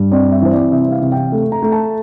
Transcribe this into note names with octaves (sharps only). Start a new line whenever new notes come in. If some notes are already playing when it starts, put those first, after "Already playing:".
Already playing: G2
C4 D5
E5
E3 C5
D5
C3 E5
F5
C3
G5
A3
A#5
A3
A5